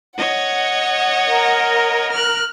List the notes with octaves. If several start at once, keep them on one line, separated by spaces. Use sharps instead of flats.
C#5 D#5 F#5
A#4
F6 F#6